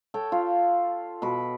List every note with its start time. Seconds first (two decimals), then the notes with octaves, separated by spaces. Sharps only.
0.14 A4 C#5 G5
0.32 F4
1.22 B2 F#4 B5